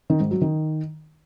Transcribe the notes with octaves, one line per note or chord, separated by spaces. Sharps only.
D#3
G#2
F#3
D#3